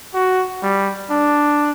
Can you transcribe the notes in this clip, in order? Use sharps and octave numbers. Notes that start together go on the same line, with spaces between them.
F#4
G3
D4